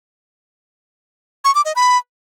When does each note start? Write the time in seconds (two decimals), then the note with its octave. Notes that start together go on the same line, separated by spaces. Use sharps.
1.44 C#6
1.55 D6
1.65 D#5
1.76 B5